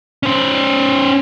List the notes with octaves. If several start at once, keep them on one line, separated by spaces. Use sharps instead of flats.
C#4 C5